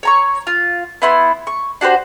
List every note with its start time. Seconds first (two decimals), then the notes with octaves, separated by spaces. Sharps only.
0.03 C#5 A#5 C#6
0.47 F4
1.02 B3 E4 C6
1.47 C#6
1.81 D4 F#4 G4 C5